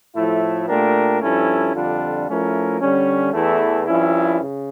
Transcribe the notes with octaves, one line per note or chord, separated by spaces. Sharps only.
A2 F3 A3 E4
A#2 A3 D4 G4 A#4
G2 F3 C#4 E4 A4
F2 D3 G3 D4 F4
F3 A3 C#4 E4 A#4
D3 G3 C#4
E2 E3 A3 E4 A4
G2 F3 C#4 E4
C#3